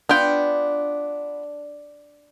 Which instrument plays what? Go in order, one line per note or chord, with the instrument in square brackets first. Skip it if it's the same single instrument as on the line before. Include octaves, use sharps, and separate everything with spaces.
[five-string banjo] B3 F4 G5 [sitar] D4